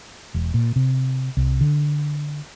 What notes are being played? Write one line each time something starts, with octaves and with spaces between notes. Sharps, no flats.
E1
A#2
C3
C2
D3